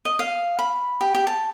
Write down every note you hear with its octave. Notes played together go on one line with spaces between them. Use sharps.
D#5
F5
B5
G4
G4
A5